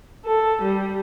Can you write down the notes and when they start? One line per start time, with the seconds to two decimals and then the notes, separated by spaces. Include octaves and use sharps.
0.25 A4
0.62 G3